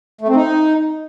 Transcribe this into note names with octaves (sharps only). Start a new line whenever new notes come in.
A3
C4
D#4